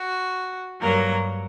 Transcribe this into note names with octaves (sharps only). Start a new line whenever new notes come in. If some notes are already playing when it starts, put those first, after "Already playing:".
Already playing: F#4
G2 F#3 A#3 A#4